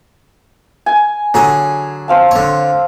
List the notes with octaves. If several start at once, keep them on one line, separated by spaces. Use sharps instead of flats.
G#5
D3 F#3 G#4 G#5
C4 F5 A5
D3 C#5